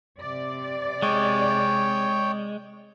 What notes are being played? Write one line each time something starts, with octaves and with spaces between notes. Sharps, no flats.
C3 D5
G#3 C#5 G5